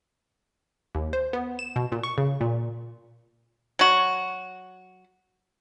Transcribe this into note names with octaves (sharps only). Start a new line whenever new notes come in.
D#2
C5
B3
E7
B2
A#2
C#6
C#3
A#2
F#3 F#4